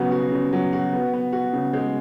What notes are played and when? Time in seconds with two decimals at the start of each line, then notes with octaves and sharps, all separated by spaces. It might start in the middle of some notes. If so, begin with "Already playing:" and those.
Already playing: C#3 F#3 B3 F#4
0.11 F#4
0.32 C#3
0.53 F#3
0.73 F#4
0.93 B3
1.13 B3
1.33 F#4
1.53 C#3
1.73 G#3